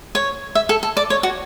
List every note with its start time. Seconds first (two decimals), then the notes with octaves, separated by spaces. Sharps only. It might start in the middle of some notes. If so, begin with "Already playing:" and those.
0.15 C#5
0.55 E5
0.69 A4
0.83 A4
0.97 D5
1.10 C#5
1.23 F#4